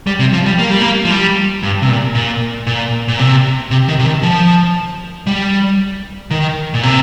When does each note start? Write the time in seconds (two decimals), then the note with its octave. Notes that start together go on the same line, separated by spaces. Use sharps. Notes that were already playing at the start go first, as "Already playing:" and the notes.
0.07 G3
0.19 C3
0.33 F3
0.46 G3
0.59 A#3
0.70 G3
0.81 A#3
1.05 F3
1.10 G3
1.63 G2
1.82 C3
1.89 A#2
2.15 A#2
2.67 A#2
3.08 A#2
3.19 C3
3.71 C3
3.88 D#3
3.99 C3
4.05 D#3
4.23 F3
5.27 G3
6.31 D#3
6.74 A#2
6.83 C3